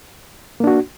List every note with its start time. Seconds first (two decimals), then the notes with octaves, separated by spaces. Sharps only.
0.60 A#3
0.64 D4
0.67 F#4